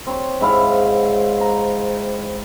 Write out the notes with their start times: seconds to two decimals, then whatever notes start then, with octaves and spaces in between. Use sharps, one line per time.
0.07 C4 C#5 C6
0.41 G#2 E4 F5
1.41 A#5